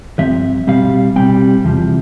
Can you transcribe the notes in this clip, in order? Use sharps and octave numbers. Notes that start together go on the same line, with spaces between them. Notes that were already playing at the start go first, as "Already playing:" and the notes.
G2 F3 C4 E5
B2 G3 C4 F5
B2 G3 C4 G5
E2 C3 F3